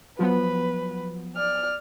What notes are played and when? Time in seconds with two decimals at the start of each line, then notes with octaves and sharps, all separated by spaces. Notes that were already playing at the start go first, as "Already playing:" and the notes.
0.19 F3 F#3 B3 B4
1.36 D5 F6